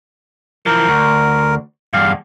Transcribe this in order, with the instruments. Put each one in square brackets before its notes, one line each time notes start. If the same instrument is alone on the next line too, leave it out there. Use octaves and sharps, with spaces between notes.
[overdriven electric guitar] E3 F3 [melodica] A#4
[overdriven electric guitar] D2
[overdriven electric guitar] E2 G2 [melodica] F5